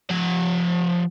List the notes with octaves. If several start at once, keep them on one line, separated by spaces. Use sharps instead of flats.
F3 F#5